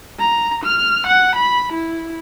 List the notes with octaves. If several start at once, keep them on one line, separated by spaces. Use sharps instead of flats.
A#5
F6
F#5
B5
E4